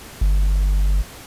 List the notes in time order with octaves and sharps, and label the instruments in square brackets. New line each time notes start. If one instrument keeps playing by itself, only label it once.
[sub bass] G1